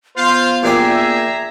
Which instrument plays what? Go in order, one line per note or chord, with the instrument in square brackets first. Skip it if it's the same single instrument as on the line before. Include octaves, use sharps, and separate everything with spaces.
[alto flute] B3 [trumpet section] F4 F5 [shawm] C5
[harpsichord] A#2 D4 G4 [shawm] G#4 [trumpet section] E5 A#5